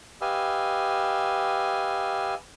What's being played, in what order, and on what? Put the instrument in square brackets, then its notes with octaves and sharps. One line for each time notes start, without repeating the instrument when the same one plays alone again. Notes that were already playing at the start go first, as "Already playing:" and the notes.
[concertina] G4 B4 D#5 F5 G#5 E6